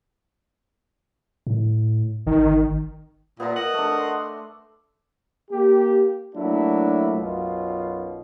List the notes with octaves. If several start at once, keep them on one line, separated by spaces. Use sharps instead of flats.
A2
G#1 D#3
A#2 B3 E5 A#5
A#4 D#5 F#5
A3 D4
C6
A#3 G4
F#3 A3 A#3 D4 E4
B1 F#2 B2 F4